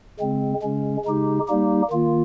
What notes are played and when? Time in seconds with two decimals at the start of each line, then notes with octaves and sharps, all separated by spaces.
0.19 C#3 G#3 C4
0.62 C#3 G#3 C#4
1.05 C#3 G#3 D#4 G4
1.48 G3 A#3 D#4 G4
1.91 D#3 A#3 F4